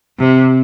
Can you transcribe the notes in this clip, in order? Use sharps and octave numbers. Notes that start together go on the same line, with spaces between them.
C3